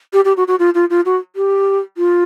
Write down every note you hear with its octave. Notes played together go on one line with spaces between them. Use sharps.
G4
G4
F#4
F#4
F4
F4
F4
F#4
G4
F4